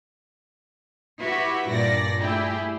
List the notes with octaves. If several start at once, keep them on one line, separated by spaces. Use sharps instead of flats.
E4 F#4 G4 B4 E5
G2 A#2 D5 A#6
A3 E4 G4 G#4